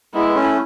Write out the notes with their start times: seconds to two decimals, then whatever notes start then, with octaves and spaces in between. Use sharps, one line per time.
0.14 G#3 B3 E4
0.29 B3
0.35 A3 C#4